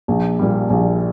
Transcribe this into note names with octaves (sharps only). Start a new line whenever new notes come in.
A#1
A#2 G3
A#1